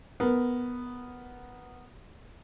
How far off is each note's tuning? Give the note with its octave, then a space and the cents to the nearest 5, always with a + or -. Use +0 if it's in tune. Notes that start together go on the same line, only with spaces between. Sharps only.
B3 +0 A#4 +0